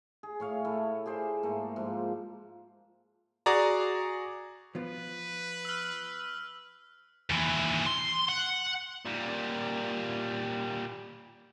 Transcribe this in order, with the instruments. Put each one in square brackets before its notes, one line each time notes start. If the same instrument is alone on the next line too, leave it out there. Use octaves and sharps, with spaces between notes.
[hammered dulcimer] G#4
A2 C#5 F5
A3 E4 A4
G4 G#4 C5 D5
G#2 A3 A#3
G#2 F3
[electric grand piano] F#4 G#4 D5 A#5
[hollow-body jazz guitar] F3 B3 F4 [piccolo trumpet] B4
[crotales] E6 F6
[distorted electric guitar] D#2 E3
C6
F#5
[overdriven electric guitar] A#2 G3